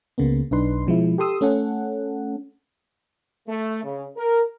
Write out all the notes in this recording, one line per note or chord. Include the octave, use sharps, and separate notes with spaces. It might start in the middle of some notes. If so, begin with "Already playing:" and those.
C#2 C#3 A#3 B3
B1 D4 D#4 B4 C6
B2 F3 G#3 E4
G4 A4 C6 D#6 E6
A3 C#4 A4 F#5
A3
C#3
A#4